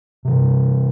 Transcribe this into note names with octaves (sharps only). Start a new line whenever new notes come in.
C3 E3